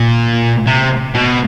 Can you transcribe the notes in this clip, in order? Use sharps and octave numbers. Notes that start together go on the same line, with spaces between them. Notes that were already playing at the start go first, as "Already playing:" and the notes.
Already playing: A#2
C3
B2